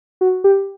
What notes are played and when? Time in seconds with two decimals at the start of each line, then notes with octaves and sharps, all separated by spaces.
0.21 F#4
0.44 G4